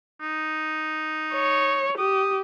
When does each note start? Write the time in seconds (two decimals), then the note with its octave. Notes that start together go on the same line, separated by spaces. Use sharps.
0.21 D#4
1.33 C#5
1.98 G4 D#6